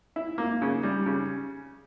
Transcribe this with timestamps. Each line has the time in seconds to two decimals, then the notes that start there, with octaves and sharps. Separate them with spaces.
0.16 E4
0.38 A#3
0.62 C#3
0.83 G3
1.06 C#3